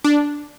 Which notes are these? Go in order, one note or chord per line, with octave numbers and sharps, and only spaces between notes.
D4